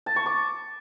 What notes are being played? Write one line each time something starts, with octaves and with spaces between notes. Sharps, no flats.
A5
C#6
D6